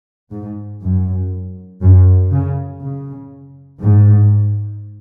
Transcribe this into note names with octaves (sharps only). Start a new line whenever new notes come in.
G#2
F#2
F#2
C#3
C#3
G#2